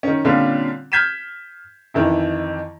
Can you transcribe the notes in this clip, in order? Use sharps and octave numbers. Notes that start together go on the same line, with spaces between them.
D#3 C#4
A#2 D3 G3 C4 C#4 F4
F6 G6 G#6 B6 D#7 E7
F2 D#3 E3 E4